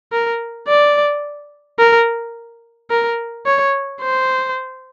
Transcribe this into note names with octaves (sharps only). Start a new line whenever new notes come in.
A#4
D5
A#4
A#4
C#5
C5